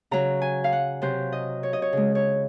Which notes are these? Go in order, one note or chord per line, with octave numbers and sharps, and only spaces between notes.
C#3 F#3 A#5
G#5
F5
F#5
C3 F#3 C5
D#5
C#5
D#5
C#5
C#3 G#3
C#5